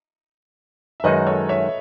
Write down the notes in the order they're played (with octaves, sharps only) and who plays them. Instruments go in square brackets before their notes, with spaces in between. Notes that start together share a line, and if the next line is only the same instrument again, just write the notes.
[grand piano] E5
[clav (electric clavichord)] F#2 D#3 G#3 D#4 F#4 [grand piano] B4 D#5
[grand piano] A4 C#5
C#5 E5